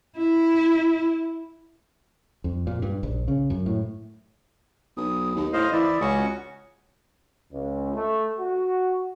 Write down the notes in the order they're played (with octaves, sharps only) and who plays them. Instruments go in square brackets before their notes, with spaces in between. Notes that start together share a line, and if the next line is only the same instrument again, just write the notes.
[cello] E4
[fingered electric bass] F2
A#2
G2
A#1
C#3
F#2
A2
[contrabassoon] B1 [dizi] D#6
[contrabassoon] D#2 [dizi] D#4
[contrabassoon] A2 [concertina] C5 D#5 F5 [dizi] D#6
[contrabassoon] E3 [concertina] E4 D5
[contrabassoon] C#2 [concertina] C#4 F#4 C#6
[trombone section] C#2
A3
F#4